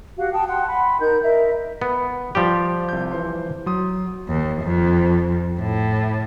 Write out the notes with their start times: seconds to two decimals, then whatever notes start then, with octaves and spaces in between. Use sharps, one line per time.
0.17 F#4 G4 F5
0.33 G5 A5 D#6
0.47 F#5 G5 C6
0.68 B5 C6
1.01 D#4 A#4 G6
1.22 A#4 D#5 E5
1.82 B3
2.35 F3 G3 G4
2.89 C2 G6
3.12 E3 C5 C6
3.66 F#3 C6 D#6
4.28 D#2
4.62 F2
5.60 A2